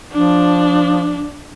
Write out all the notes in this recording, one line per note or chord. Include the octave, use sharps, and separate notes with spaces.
F3 D4